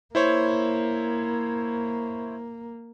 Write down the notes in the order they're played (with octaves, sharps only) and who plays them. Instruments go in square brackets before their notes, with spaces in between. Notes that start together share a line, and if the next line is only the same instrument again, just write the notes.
[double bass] A#3 [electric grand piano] E4 C5 C#5